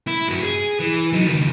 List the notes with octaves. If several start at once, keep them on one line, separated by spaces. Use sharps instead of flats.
E4
G2 F#3
G#4
E3
F#3 D#4
C#2 D#3